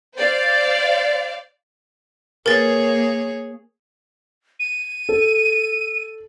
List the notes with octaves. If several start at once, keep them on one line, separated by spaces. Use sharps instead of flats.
C5 D5 F5
A#3 G#4 A#4 B4 C#5 A6
D#7
A4